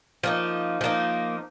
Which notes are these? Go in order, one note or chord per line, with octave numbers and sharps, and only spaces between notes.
F3 A#3 D#4
F3 A#3 D#4